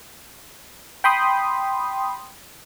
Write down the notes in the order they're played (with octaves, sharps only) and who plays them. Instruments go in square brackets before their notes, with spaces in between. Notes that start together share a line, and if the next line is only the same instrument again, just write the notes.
[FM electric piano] G5 B5 C6 D#6